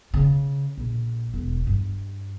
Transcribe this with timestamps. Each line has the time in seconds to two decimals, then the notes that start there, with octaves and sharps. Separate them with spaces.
0.14 C#3
0.77 A#1
1.34 E1
1.67 G2